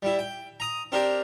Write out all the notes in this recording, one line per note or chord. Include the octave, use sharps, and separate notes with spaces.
G3 E4
G5
A#5 D#6
C4 D4 G4 A#4